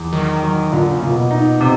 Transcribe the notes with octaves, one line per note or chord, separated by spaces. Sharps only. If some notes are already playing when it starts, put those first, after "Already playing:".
Already playing: E2
D#3 F#3
F#3
A#2 D3
C#3
A#2
B2
D#4
C3